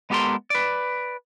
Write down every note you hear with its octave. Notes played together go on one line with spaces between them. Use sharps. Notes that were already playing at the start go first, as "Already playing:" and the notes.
G#3 B3 G4 A4 A#4 C6
B4 D5